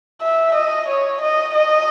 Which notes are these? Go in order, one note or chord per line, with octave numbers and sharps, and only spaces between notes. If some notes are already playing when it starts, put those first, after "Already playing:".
E5
D#5
C#5
D#5
D#5